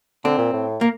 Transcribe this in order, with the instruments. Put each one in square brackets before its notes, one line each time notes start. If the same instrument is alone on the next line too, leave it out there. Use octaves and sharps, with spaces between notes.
[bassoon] D3 [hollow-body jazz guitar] C4
[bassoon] A#2
A2
[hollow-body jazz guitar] A#3